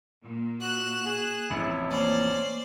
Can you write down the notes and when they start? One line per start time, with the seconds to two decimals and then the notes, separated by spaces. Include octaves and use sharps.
0.23 A#2
0.61 F#4 F#6 E7
1.06 G#4
1.50 A1 F2 C3 E4
1.91 A#3 C#4 C5 D5